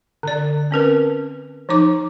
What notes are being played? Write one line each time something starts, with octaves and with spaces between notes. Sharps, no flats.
D3 D5
C4 C#4 A#4 B4
F3 D#4 D6